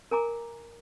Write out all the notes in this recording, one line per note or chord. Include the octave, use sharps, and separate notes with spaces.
A#4 G#5 A#5 D6